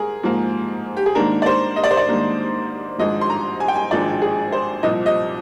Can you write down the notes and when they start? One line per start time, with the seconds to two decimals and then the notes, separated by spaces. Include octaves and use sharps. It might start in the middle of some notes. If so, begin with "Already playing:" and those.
Already playing: G#2 G#4 A#4
0.23 G#2 F3 A#3
0.97 G4
1.06 G#4
1.15 G#2 D#3 A#3 D4 A#4
1.42 D5
1.46 C5
1.76 D#5
1.84 D5
1.91 C5
1.97 D5
2.07 G#2 D#3 A#3 D4
2.99 G#1 G#2 F3 G#3 D4 D#5
3.21 C6
3.30 A#5
3.60 G#5
3.68 G5
3.76 G#5
3.91 G#1 G#2 F3 G#3 D4 D5
4.22 G#4
4.52 C5
4.83 C2 A#2 F3 C4 D#5
5.06 D#5